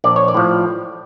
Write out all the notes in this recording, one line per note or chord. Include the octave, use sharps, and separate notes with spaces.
A#1 D5
C#5
D5
A2 F3